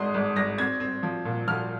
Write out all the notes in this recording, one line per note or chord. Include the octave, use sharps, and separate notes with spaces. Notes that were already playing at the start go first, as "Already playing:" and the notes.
Already playing: G#1 G#2 G#3 C6 D#6
G#1
G#1 A#6
C4 G#6
C4
F3
A#2
F3 F6